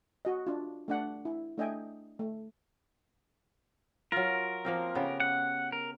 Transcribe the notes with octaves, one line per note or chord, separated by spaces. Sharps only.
F#4 D#5
D4 F4
A3 D4 F#5
E4
A3 D4 D#5 E5 G5 G#5
A3
F#3 F4 A#4
F3 A#3 C4
C#3 B3 G4
F#5
A#4